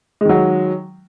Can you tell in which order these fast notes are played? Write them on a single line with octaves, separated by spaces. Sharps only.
G#3 D#3 F#3